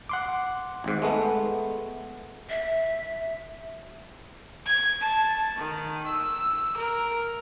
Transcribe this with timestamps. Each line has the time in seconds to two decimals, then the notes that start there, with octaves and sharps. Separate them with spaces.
0.09 F#5 C6 D6
0.84 G#1 G#2
1.02 G#3 A3 B3
2.49 E5
4.66 G#6
5.01 A5
5.57 D#3
6.07 E6
6.77 A#4